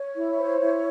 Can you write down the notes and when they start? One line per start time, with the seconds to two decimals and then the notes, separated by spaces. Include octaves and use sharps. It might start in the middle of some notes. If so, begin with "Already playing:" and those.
Already playing: C#5
0.16 E4
0.38 C5
0.60 E4